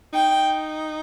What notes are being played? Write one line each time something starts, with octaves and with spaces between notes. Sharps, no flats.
D#4 G5